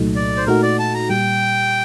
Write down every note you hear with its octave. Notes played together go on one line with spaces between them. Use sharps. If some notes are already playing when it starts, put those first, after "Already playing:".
Already playing: C2 A#2 F#3 A3 D#4
D5
C5
A#2 A3 D#4 F#4 A#4
D5
A5
A#5
A#2 G3 G5